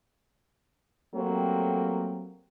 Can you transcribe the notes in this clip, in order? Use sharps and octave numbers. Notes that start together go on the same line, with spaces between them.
F#3 G3 A3 A#3 C4